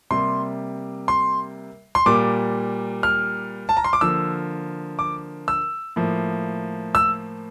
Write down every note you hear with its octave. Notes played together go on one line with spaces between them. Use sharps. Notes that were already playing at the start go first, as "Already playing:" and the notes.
C3 G3 A#3 C6
C6
C6
A#2 G3 A#3 D6
F6
A5
A#5
C6
D6
D3 F3 A#3 E6
D6
E6
A2 F3 A#3
E6